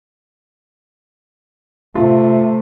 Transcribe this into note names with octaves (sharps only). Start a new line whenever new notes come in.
C3 A3 F4